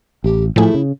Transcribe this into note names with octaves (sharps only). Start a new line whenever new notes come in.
A1 G4
A2 F3 G3 A3 E4 G#4
C#3